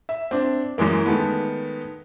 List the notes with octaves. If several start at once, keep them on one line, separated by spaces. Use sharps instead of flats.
E5
C4 D4
F#2 E3 G#3 A#3
D#3 G#3 A3 B3